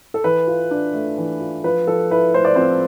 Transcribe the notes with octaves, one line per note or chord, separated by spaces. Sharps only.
A4
E3 B4
F4
D4
A3
E3
F4
F3 B4
F3 A4
E4 B4
A3 C5
D5
F3 C4 C5